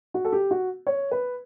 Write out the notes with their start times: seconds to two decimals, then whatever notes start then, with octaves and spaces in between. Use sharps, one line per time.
0.14 F#4
0.25 A4
0.32 G4
0.51 F#4
0.87 C#5
1.11 B4